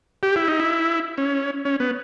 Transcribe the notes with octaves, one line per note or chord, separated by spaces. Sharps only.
G4
E4
D#4
E4
C#4
C#4
B3